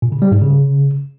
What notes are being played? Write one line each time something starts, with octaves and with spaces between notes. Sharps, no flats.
A#2
C#3
G3
G#2
C#3